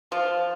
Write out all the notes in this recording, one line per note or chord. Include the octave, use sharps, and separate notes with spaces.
F3 F4